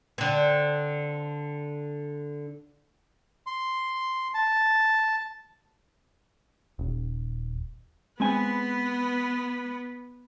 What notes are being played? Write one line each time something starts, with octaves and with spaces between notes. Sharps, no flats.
D3 C4
C6
A5
D#1
G#3 B3 C4 B4 G#5